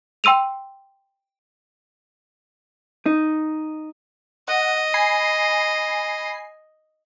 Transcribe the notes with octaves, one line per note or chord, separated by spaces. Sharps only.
G5 C6 E6 D#7 F7
D#4
D#5 F#5
G#5 B5 C7